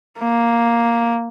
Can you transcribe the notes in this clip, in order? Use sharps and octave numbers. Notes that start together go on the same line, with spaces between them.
A#3